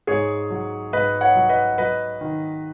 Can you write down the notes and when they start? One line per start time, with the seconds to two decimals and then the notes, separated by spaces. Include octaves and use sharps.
0.07 G#2 G#4 C#5
0.50 F#3
0.93 G#2 B4 D#5
1.21 C#5 F#5
1.35 F#3
1.49 B4 D#5
1.78 F#3 B4 D#5
2.21 D#3